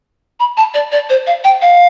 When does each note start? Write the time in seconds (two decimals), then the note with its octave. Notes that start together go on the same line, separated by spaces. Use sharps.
0.40 B5
0.57 A5
0.74 D5
0.92 D5
1.09 C5
1.27 F5
1.44 G5
1.62 F5